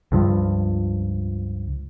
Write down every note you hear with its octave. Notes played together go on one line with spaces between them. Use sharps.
C#2 G2 F3